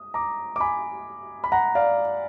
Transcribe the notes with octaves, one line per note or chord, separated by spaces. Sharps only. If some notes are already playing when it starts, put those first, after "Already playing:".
Already playing: D#6
A#5 D6
D6
G#5 B5
B5
F#5 A#5
D5 F5